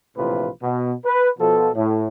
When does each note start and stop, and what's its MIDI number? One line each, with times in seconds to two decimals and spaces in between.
0.17 0.49 34
0.17 0.49 45
0.17 0.49 48
0.17 0.49 52
0.17 0.49 65
0.17 0.49 71
0.62 0.93 47
1.05 1.28 71
1.39 1.69 47
1.39 1.69 53
1.39 1.69 69
1.75 2.08 45